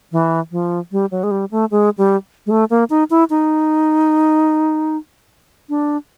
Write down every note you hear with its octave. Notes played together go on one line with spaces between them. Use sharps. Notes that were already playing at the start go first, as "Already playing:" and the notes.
E3
F3
G3
F#3
G#3
G3
A3
G#3
G3
G#3
A3
A#3
D#4
E4
D#4
D4